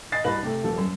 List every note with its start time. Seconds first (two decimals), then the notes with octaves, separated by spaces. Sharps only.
0.12 D#5 G#5 A6 C7
0.24 C2 B2 B4 A#6 F#7
0.43 C3 A3
0.63 D#1 F3 A4
0.77 F#2